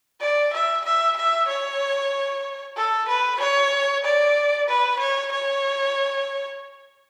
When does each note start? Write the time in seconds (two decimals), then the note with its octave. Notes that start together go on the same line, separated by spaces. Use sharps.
0.21 D5
0.53 E5
0.85 E5
1.17 E5
1.48 C#5
2.77 A4
3.08 B4
3.40 C#5
4.04 D5
4.68 B4
4.99 C#5
5.32 C#5